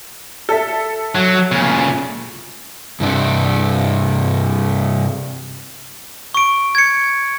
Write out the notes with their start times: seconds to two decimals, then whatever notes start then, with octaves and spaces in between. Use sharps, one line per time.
0.49 A4 E5
1.15 F#3
1.52 A#2 C#3
3.00 G2 C3 D4
6.34 C#6 D7
6.75 G#6 C#7